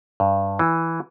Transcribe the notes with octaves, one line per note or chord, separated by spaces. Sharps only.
G2
E3